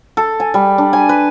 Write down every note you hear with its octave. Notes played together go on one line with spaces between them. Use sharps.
A4
G#5
G3
D4
G#5
B4